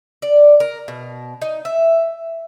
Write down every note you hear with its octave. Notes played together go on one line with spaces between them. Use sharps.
D5
A#4
B2
D#4
E5